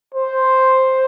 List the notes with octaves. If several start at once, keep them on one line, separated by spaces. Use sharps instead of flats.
C5